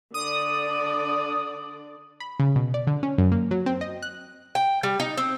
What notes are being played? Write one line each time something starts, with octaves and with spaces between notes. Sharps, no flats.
D3 D4 D5 D#6
B5
C#3
B2
D5
D3
C#4
F#2
A#3
F#3
C4
D#5
F#6
G5
G3
D#4
C4